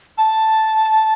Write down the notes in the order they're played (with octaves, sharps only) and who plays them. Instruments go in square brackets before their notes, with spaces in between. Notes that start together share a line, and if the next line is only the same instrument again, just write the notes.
[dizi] A5